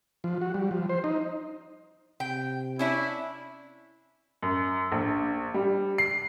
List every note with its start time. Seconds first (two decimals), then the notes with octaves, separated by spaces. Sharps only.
0.24 F3
0.41 F#4
0.54 G3
0.71 F3
0.89 C5
1.04 D#4
2.20 C3 G5
2.79 C#4 D4 E4 E5
4.43 F#2
4.92 A#1
5.54 G3
5.98 C7